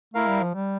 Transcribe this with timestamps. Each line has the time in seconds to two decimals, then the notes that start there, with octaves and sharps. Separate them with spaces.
0.14 A3 E4 A#4 F5
0.28 G3
0.42 F3
0.55 G3